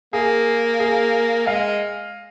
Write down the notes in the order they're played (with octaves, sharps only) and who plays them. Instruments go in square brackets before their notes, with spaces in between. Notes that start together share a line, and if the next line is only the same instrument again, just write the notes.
[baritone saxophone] A#3 [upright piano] G#4
[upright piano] G#4
[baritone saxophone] G#3 [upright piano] F5